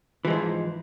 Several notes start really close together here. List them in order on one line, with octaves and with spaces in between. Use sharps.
E3 G#3 F3 G#2